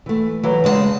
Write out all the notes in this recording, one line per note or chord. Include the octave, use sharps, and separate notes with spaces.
E3 A3
E3 F#3
C#3 G#3 D5 A5